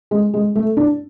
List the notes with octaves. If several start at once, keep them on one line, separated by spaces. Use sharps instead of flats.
G#3
G#3
A3
D4